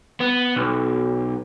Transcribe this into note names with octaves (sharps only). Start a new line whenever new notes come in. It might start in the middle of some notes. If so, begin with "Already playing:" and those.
B3
B1